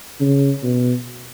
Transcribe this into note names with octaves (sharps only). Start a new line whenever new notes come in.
C#3
B2